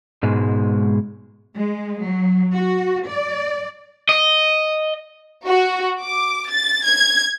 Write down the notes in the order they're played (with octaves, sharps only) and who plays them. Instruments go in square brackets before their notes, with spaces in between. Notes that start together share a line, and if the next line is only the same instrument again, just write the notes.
[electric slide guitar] G#2 B2 G#3
[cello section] G#3
F#3
F#4
D5
[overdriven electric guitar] D#5
[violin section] F#4
D6
A6
G#6